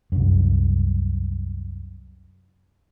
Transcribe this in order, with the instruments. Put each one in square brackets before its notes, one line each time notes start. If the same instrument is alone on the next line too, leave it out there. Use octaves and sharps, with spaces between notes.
[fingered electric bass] C2 F#2